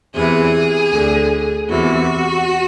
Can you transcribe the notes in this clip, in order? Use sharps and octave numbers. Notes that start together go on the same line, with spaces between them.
E2 C3 E3 G#4
D2 D3
E2 C3 E3 F#4